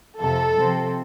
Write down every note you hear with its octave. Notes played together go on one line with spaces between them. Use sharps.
F2 C3 F3 A4
C3 F3 C4